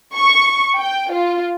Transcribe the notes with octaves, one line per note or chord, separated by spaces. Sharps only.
C#6
G5
F4